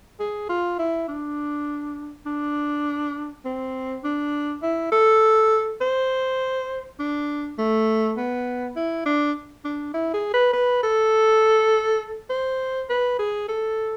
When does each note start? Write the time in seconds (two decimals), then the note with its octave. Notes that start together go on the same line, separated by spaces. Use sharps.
0.20 G#4
0.49 F4
0.79 E4
1.08 D4
2.26 D4
3.45 C4
4.04 D4
4.62 E4
4.92 A4
5.81 C5
6.99 D4
7.58 A3
8.17 B3
8.76 E4
9.06 D4
9.65 D4
9.94 E4
10.14 G#4
10.34 B4
10.53 B4
10.83 A4
12.30 C5
12.89 B4
13.19 G#4
13.49 A4